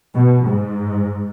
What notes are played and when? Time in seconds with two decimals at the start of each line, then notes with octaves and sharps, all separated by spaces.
0.15 B2
0.47 G#2